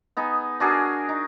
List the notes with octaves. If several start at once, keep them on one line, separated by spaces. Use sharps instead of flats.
B3 D#4 G#4
D4 F#4 G#4 A#4
D#4